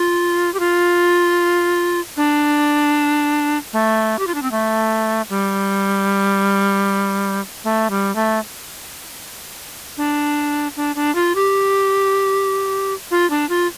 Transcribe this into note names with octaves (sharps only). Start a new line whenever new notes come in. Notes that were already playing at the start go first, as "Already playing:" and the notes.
Already playing: F4
G4
F4
D4
A3
G4
F4
D4
C4
A3
G3
A3
G3
A3
D4
D4
D4
F4
G4
F4
D4
F4